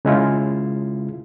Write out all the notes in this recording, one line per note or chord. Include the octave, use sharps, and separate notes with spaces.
C#3 G#3 E4 F4